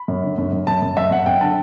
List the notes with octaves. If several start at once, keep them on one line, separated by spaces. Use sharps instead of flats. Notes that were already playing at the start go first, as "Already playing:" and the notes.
Already playing: B5
F#2
D3
F#2
F#2
F#2 A5
F#2
F#2 E5
F#2 F#5
F#2 G5
D3 A5